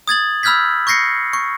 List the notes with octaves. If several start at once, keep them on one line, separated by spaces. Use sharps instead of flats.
D#6 G#6 A6 F#7
B5 E6 F6 G6 G#6 B6
C#6 G6 A#6 C7 C#7
C#6